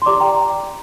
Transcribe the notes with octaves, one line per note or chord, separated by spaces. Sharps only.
C6
G4 D5 A#5 D6
G5 A#5